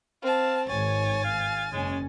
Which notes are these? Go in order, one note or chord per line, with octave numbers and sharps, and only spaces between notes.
C4 F5 A5
G#1 C#5 G#5 A6
F5
F#1 G#3 C#4